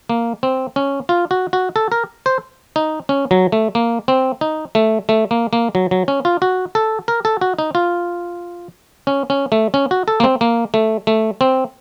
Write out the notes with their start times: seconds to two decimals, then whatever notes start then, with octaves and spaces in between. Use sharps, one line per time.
0.09 A#3
0.43 C4
0.76 C#4
1.09 F4
1.31 F#4
1.53 F#4
1.76 A4
1.92 A#4
2.26 C5
2.76 D#4
3.09 C#4
3.31 F#3
3.52 A3
3.75 A#3
4.08 C4
4.41 D#4
4.75 A3
5.09 A3
5.31 A#3
5.53 A#3
5.75 F#3
5.91 F#3
6.08 C#4
6.25 F4
6.42 F#4
6.75 A4
7.08 A#4
7.25 A4
7.41 F#4
7.59 D#4
7.75 F4
9.07 C#4
9.30 C#4
9.52 A3
9.74 C#4
9.91 F#4
10.08 A4
10.20 A#3
10.24 C4
10.41 A#3
10.74 A3
11.07 A3
11.41 C4